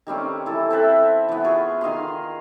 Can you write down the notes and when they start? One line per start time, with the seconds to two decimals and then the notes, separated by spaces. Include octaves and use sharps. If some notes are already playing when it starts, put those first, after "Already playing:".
0.07 D#3 G3 C4 C#4
0.46 E3 E4 A4
0.70 C4 A4 B4 E5
1.29 E3 B3
1.44 F4 G#4 B5 C#6
1.81 D#3 D#5 F5 C6